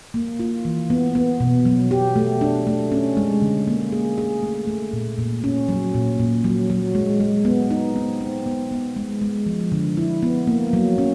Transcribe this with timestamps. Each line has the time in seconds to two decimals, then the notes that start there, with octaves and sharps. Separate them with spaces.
0.14 A#3
0.40 F4
0.65 E3
0.90 B3
1.15 B3
1.40 B2
1.65 F#3
1.91 G4
2.16 A3
2.41 D4
2.67 A3
2.92 C#4
3.17 G#3
3.42 D3
3.67 A#3
3.92 G#4
4.18 G#4
4.43 A3
4.68 A3
4.93 A#2
5.18 A#2
5.44 C#4
5.69 F#3
5.94 A#2
6.20 A#2
6.44 F#3
6.70 F#3
6.95 G#3
7.20 G#3
7.45 B3
7.71 D#4
7.96 C4
8.21 C4
8.46 B3
8.71 B3
8.96 G#3
9.21 G#3
9.46 F3
9.72 D3
9.97 E4
10.23 B3
10.47 A#3
10.73 F#3
10.98 C#4